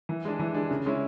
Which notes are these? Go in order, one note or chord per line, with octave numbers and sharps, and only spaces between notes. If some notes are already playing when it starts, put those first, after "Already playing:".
E3
G#3 D4
E3
G#3 D4
C#3
G#3 C#4 E4